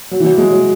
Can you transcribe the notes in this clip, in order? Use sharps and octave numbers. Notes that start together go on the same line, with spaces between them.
F#3
E3
F#3
G#3
F#3